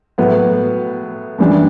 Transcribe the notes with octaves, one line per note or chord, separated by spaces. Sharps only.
A2 F#3 B3
F#2 E3 G3 D4